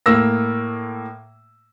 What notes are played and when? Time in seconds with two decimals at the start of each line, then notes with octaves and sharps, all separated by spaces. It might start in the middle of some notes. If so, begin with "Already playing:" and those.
0.06 A2 A#3 E6 A#6